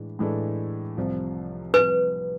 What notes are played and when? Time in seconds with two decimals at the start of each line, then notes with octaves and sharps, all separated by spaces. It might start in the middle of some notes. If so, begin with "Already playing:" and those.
Already playing: A2 E3 G#3 D4
0.19 A2 E3 G#3 D4 A4
0.97 C2 C3 F3
1.74 C2 C3 F3 B4